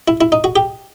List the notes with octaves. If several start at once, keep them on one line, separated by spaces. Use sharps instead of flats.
E4
E4
D#4
F#4
G4